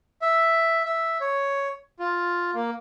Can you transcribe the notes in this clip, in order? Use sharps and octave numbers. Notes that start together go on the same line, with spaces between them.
E5
E5
C#5
F4
A#3